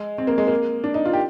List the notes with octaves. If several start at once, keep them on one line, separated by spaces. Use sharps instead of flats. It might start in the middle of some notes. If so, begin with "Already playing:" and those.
Already playing: G#3
C4
A#3
G#3
A#3
D4
D#4
F4
G4